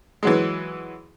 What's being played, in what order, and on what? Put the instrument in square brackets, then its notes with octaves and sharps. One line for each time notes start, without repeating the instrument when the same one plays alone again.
[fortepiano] E3 F#3 G#3